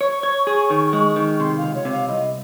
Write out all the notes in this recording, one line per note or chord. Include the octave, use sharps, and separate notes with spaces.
C#5 C#6
C#5
G#4
D#3
G#3
D#3
C3 C6
F5
C#2
C#5
C3
F5
C2 D#5